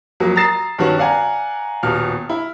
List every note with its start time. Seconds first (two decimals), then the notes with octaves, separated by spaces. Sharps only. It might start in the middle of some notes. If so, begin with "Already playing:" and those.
0.20 F2 F#3 A#3
0.36 A#5 D#6 E6 A6 C7 E7
0.78 G2 D#3 B3 C#4 F#4
0.98 D5 F5 F#5 G#5 A#5
1.83 D#1 B2 F6
2.29 E4